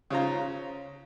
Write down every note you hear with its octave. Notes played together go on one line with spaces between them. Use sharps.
C#3 C#4 F4 C5 A#5